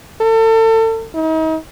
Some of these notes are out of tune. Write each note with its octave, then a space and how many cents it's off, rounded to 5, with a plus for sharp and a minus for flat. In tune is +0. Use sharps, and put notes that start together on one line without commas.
A4 +35
D#4 +40